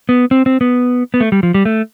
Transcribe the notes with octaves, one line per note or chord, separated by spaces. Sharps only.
B3
C4
C4
B3
B3
A3
G3
F3
G3
A3